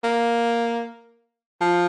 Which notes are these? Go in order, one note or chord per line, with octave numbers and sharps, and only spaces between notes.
A#3
F3